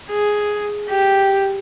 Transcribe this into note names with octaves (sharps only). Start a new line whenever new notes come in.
G#4
G4